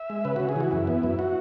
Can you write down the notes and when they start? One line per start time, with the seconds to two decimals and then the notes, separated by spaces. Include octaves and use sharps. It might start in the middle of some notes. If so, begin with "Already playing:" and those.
Already playing: E5
0.10 G#3
0.25 C#3 B4
0.36 C#3 F#4
0.49 G#4
0.56 E3 F#4
0.71 F#2 E4
0.87 B3
1.03 F#2
1.19 F#4